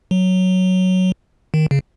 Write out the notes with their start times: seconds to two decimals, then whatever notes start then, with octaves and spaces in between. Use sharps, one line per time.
0.11 F#3
1.54 D#3
1.71 C#3